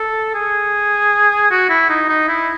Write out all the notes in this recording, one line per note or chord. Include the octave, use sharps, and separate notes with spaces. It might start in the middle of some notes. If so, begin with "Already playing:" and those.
Already playing: A4
G#4
F#4
E4
D#4
D#4
E4